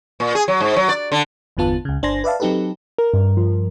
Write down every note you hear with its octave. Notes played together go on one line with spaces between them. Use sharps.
A#2
G#4
F#3
G#2
F#3
D5
D3
G1 E2 D3 B3 F4 A5
C#2 C#3
G1 D4 C5 G#5 C6 A#6
B4 D5 E5 F5 A5
F#3 C4 D#4 G4 A4 B4
A#4
G2
F3